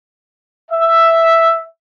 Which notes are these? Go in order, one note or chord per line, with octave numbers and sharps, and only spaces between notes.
E5